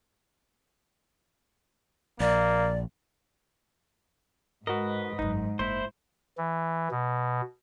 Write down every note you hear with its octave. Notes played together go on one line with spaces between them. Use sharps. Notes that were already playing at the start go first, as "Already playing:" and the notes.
A#1 A#3 D5
G#2 F#4 A#4 B4 D#5
G#1 F#2 D#4
F#1 A#3 E4 C5
E3
B2